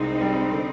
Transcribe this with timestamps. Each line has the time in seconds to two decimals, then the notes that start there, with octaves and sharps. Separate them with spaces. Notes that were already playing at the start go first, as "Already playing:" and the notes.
Already playing: C2 G#3 C4 D#4
0.21 G3
0.52 D3